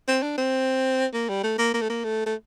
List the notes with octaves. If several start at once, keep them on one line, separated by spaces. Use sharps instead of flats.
C4
D4
C4
A#3
G3
A3
A#3
A#3
A3
A#3
A3
A3